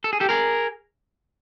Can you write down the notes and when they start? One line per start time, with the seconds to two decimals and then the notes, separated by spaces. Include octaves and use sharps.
0.04 A4
0.13 G#4
0.20 G4 A4
0.29 G#4 A#4